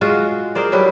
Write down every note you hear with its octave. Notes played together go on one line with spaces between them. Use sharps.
G#3 F4 F#4
G#4 A#4 C5 D5
F#3 G3 E4 B4